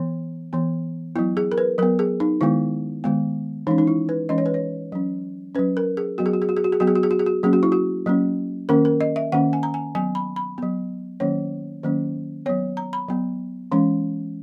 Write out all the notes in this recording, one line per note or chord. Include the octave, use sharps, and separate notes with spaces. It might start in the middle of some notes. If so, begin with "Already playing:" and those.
Already playing: E3 B3
E3 B3
F#3 B3 E4
G#4
A#4
B4
F#3 B3 A#4
G#4
D#4
D#3 G#3 B3 E4
D#3 G#3 B3
E3 G#3 C#4 D#4
D#4
E4
B4
E3 G#3 C#4 D#5
C#5
B4
C#5
F#3 C#4
F#3 C#4 B4
A#4
G#4
F#3 B3 F#4
G#4
F#4
G#4
F#4
G#4
F#4
G#4
F#3 B3 F#4
G#4
F#4
G#4
F#4
G#4
F#4
F#3 A#3 C#4 G#4
F#4
E4
F#4
F#3 A#3 C#4
D#3 A#3 C#4 A#4
A#4
D#5
E5
D#3 A#3 C#4 F#5
G#5
A#5
G#5
F#3 B3 G#5
B5
B5
F#3 B3
D#3 F#3 A#3 C#4 C#5
D#3 F#3 A#3 C#4
F#3 B3 C#5
A#5
B5
F#3 B3
E3 G#3 C#4